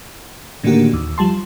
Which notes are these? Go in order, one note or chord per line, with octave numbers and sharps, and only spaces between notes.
A2 D3 D#3 A#3 F#4 G4
D#2
F3 G3 A5 C6